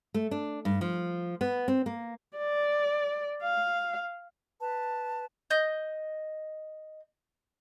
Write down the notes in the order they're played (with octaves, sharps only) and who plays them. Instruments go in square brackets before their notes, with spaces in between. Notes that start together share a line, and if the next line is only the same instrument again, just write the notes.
[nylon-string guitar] A3
D4
G2
F3
B3
C4
A#3
[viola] D5
F5
[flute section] B4 A5
[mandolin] D#5 G6